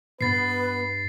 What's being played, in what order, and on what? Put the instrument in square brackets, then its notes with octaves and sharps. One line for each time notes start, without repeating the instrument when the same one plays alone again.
[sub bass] G2 [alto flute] B3 [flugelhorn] B4 [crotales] A6 C7